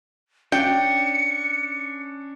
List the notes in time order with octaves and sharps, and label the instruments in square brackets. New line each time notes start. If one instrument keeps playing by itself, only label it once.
[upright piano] C#4 D4 [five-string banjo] G5 [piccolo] C#7